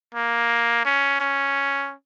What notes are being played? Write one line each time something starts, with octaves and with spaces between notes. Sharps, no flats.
A#3
C#4
C#4